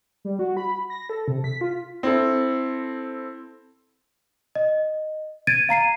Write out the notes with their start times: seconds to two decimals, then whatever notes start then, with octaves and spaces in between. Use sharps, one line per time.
0.25 G3
0.39 F#4
0.57 B5
0.90 A#6
1.10 A4
1.28 C3
1.44 B6
1.61 F4
2.03 C4 E4 A4
4.55 D#5
5.47 G#6 A6 D7 D#7
5.69 F5 A#5 C7 D#7